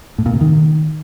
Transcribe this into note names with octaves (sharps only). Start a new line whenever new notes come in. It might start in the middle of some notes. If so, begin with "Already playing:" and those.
A2
A#2
C3
D#3